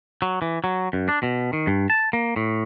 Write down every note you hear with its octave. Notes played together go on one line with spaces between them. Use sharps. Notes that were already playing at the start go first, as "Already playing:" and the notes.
F#3
E3
F#3
F#2
D4
B2
D#3
G2
A5
A#3
A2